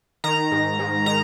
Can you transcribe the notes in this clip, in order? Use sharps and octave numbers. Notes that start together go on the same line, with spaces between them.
D#3 A#5
G#2
G#2
D#3 A#5